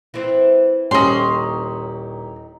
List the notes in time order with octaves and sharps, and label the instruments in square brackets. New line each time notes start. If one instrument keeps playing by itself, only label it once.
[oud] E3 C4
[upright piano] D#1 G4 F#7 [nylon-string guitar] C#4 [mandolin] D#4 C6